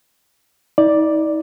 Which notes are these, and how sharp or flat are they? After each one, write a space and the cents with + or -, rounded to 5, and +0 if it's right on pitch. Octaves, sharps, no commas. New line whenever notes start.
D#4 +40 D5 +0